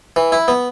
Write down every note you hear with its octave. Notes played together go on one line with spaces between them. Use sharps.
E3
E4
B3